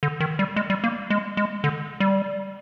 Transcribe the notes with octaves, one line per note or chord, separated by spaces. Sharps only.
D3
D#3
G3
G#3
G3
A#3
G#3
G#3
D3
G3